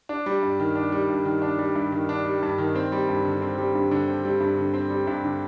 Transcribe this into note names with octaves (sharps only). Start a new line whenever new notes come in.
D4
G3
G2
D#3
D4
G3
G2
D#3
D4
G3
G2
D#3
D4
G3
G2
D#3
C4
G3
G2
D3
C4
G3
G2
D3
C4
G3
G2
D3
C4
G3
G2
D3